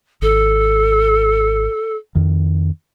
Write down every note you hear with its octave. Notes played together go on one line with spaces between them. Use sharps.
G#1 A4
F2 D#3